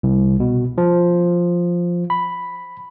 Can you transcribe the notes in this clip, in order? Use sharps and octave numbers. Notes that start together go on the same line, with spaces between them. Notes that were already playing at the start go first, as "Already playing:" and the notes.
C2
B2
F3
B5